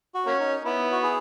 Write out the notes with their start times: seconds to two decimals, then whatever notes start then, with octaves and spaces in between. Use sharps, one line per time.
0.14 F#4
0.27 A#3 C#4
0.40 D#4
0.65 B3 E4
0.92 F#4
1.03 E4 G#4